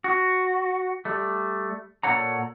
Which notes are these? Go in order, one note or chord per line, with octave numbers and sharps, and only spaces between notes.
F#4
G3 A3
A#2 C#3 A4 C#5 F#5 A#5